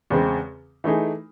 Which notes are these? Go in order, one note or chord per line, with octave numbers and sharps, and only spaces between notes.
E2 C#3 G#3 C4
E3 A3 D#4 G#4